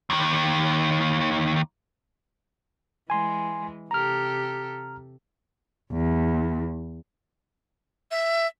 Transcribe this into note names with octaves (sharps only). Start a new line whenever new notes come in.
D#2 D#3
E3 G#3 G#5 C6
C3 G4 A4 A#5 F6
E2
E5